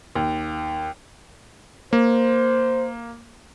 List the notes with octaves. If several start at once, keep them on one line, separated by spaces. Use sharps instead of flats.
D#2
A#3 C5